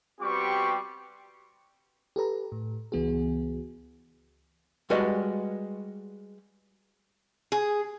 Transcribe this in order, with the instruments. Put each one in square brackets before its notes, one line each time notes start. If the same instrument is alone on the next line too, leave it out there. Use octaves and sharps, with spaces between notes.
[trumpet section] G3 B3 C4 F#4 G4 C#6
[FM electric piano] G4 A4 B4 A#5
A2
C#2 E3 B3 F#4 G#4
[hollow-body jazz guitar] G3 G#3 F#4 B4 D5 D#5
[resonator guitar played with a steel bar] G#4